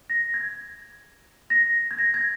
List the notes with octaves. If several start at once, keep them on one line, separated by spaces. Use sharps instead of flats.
A#6
G#6
A#6
G#6
A#6
G#6